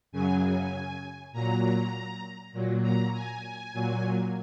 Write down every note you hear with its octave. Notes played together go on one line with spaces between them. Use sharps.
F#2 C#3 F#3 G#5
A#2 F#3 A#5
A#2 F#3
A#5
G#5
A#2 F#3